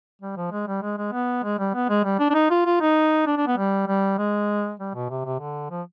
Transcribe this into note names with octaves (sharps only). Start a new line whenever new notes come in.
G3
F3
G#3
G3
G#3
G#3
B3
G#3
G3
B3
G#3
G3
D4
D4
D#4
F4
F4
D#4
D4
D4
B3
G3
G3
G#3
G3
B2
C3
C3
D3
F3